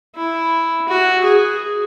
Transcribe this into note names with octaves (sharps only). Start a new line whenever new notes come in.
E4
F#4
G#4